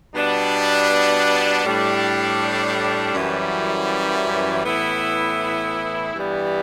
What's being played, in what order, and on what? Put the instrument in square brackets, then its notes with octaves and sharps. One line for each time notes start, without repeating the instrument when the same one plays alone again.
[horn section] B2 G3 B3 D4
A2 G3 D4
F#2 E3 G3
A2 E3 B3 E4
G2 E3 G3 B3